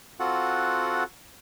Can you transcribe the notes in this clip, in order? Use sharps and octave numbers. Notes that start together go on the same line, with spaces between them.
C4 F4 F#4 A4 F#5